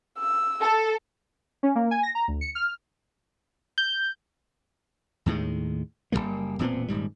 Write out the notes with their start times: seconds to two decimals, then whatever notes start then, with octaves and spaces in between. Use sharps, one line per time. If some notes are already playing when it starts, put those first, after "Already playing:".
0.18 E6
0.61 A4
1.63 C#4
1.75 A#3
1.91 G#5
2.03 A#6
2.15 A#5
2.28 D2
2.41 C#7
2.55 F6
3.78 G6
5.26 D#2 A2 D#3 G#3
6.12 F#1 G2 G3 A#3
6.59 E1 A#2 B3 C4
6.88 D#1 G#2 G3